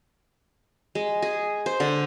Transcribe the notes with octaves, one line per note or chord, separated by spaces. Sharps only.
G#3
G#4
C5
D3